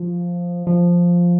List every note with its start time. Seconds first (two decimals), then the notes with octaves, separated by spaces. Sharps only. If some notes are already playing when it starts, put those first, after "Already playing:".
Already playing: F3
0.67 F3